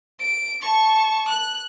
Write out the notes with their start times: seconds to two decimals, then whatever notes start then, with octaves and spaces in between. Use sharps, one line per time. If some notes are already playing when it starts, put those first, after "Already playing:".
0.20 D7
0.63 A5 C#6
1.29 F#6